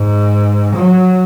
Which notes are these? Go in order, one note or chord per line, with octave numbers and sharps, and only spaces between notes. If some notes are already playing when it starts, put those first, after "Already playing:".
Already playing: G#2
F#3